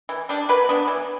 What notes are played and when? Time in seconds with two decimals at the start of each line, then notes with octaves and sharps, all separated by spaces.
0.09 E3
0.29 G3 D4
0.49 F#3 B4
0.69 B3 D4
0.88 E3